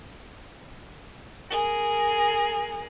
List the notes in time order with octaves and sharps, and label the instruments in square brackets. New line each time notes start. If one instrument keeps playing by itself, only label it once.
[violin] G#4 A#4